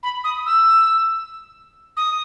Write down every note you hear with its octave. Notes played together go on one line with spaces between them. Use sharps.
B5
D#6
E6
D#6